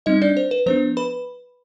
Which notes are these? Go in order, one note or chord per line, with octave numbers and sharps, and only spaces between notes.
G3 C4 D#4 D#5
D4 D5
C5
B4
F3 B3 D4 C5
B4 B5